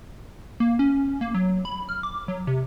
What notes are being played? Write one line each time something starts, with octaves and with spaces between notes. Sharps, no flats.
A#3
C#4
A#3
F#3
B5
F6
D6
F#3
C3